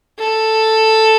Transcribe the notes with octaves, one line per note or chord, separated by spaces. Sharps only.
A4